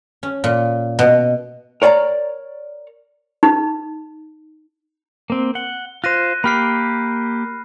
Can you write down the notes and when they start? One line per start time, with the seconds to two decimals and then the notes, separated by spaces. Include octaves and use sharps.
0.23 C#4
0.44 A#2
0.99 B2
1.82 A#4 C#5 D5 F#5 A#5
3.43 D#4
5.30 A#3 C4
5.55 F#5 G7
6.04 F4 C5 F#6 A#6 D#7
6.44 A#3 G4 B5 F6 C7